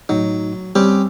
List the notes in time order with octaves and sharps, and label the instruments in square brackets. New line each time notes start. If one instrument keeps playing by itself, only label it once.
[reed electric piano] A2 D#4 [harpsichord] F#3
[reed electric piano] G3 [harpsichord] C4 C#4 G4